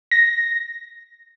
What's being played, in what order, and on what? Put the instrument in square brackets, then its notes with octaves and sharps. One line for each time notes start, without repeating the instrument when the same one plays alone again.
[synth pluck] A#6